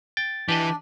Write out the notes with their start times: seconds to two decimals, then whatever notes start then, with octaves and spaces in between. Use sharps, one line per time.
0.17 G5 A6
0.49 E3 D4 G4 B4 D5 D#5